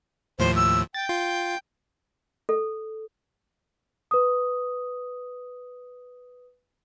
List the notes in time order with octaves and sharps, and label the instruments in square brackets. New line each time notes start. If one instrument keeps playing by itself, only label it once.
[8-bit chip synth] D#2 A2 F3 [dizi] C5
[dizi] E6
[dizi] G5 [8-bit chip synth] A6
[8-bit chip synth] F4
[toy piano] A4
[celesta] B4 D#6